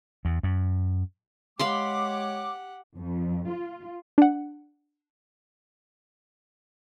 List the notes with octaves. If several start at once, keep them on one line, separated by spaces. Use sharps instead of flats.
E2
F#2
G#3 G4 C#5 F5 F#5 B5 C6 D6
F2
F4
D4 F#5